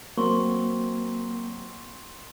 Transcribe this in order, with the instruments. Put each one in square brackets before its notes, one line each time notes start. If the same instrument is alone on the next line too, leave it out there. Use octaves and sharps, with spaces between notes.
[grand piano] F#3 C4 [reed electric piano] A#3 [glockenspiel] C6 C#6